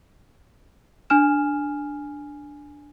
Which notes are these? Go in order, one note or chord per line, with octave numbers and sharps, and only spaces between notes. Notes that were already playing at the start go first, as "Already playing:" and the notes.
D4 G#5 F6 E7